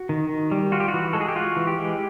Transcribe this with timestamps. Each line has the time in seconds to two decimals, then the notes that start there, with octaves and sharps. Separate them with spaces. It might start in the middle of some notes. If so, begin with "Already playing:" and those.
Already playing: F#4
0.09 D#3
0.29 D#3
0.51 G3
0.72 F4 F#4
0.80 G4
0.88 F#4
0.94 E3
1.13 G#3 A4
1.21 G#4
1.28 G4
1.36 F4 F#4
1.57 E3
1.67 G4
1.78 G#3